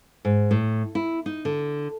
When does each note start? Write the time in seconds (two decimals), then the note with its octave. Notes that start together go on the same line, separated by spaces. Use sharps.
0.25 G#2
0.51 A2
0.95 E4
1.26 D#4
1.45 D3